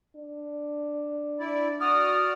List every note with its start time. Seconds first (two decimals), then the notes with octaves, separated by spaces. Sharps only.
0.16 D4
1.40 E4 D5
1.81 F#4 D5 D#6 F6